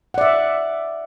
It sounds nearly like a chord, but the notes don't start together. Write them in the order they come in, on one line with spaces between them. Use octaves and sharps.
F#5 D5 E5